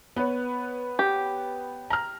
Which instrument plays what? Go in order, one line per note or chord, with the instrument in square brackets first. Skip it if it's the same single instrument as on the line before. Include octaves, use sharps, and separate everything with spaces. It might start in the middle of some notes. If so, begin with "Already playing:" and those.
[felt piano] B3 B4 C#5
[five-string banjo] G4
[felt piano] A#5 F6